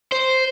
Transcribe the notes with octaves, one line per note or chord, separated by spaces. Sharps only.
C5